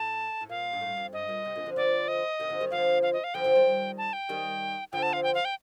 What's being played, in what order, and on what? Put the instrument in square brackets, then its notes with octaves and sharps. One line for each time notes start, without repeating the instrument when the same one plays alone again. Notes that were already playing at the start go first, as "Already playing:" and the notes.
Already playing: [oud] A2 [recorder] A5
[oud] A2
[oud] A#2 [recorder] F5
[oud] G2
A2
F2
[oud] G2 [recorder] D#5
[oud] A#2
C3
A#2 D3
D3 F3
[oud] D3 F3 [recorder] D5
[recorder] D#5
[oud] C3 D#3
D3 F3
D#3 G3
[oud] D3 F3 [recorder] F5
[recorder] F5
D#5
F5
[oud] D3 F3 [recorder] G5
[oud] D3 F3
D#3 G3
[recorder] A5
G5
[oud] D#3 G3
[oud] D3 F3 [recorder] G5
[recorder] A5
F5
G5
F5
G5